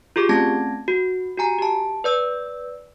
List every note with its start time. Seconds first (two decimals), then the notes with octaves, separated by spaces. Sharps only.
0.16 F4 G4 G#4 D6
0.29 A3 C4 C#4 A5 G#6 A#6
0.88 F#4
1.37 F#4 G4 G#5 A#5
1.59 G4 A5
2.04 B4 D5 E6